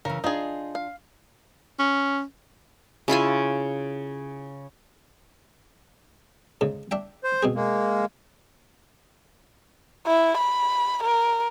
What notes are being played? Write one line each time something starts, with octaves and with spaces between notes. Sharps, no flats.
C#3 E3 A#4
D4 D#4 F4 G#4
F5
C#4
C#3 E4 F4 G#5
G#2 C#3
D4 E5 G5
C5
B2 C4 G#4
G#3 A#3
E4
B5
A#4